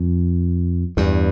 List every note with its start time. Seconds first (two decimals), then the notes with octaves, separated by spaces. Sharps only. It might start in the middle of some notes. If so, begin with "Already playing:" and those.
Already playing: F2
0.97 E2 G2